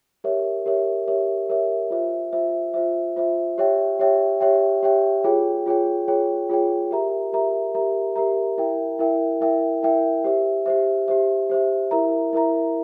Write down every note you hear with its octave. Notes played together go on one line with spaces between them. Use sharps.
G4 A#4 C#5 E5
G4 A#4 C#5 E5
G4 A#4 C#5 E5
G4 A#4 C#5 E5
F4 C5 E5
F4 C5 E5
F4 C5 E5
F4 C5 E5
G4 C#5 E5 G5
G4 C#5 E5 G5
G4 C#5 E5 G5
G4 C#5 E5 G5
F4 G#4 C#5 G5
F4 G#4 C#5 G5
F4 G#4 C#5 G5
F4 G#4 C#5 G5
G4 A#4 E5 A#5
G4 A#4 E5 A#5
G4 A#4 E5 A#5
G4 A#4 E5 A#5
E4 A#4 E5 G5
E4 A#4 E5 G5
E4 A#4 E5 G5
E4 A#4 E5 G5
G4 C5 E5
G4 C5 E5
G4 C5 E5
G4 C5 E5
E4 A#4 E5 A#5
E4 A#4 E5 A#5